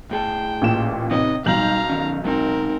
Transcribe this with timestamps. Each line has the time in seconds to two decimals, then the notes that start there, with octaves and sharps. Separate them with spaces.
0.11 A2 G#4 G5 A5
0.61 A1 A#2 E7
1.11 C3 D#4 B4 C#5 D#5
1.46 B1 G3 C4 D#4 F5 A#5 G6 F#7
1.89 D#3 C#4
2.25 G#3 C4 D#4 A#4